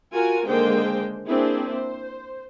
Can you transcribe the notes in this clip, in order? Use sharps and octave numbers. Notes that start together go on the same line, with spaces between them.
F4 F#4 A#4 G#5
D3 D#3 G#3 A#3 C5 G5
A#3 C4 D4 E4 G#4
C5